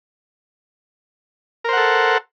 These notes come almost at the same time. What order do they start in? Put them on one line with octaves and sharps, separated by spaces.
A#4 C5 F#5 A4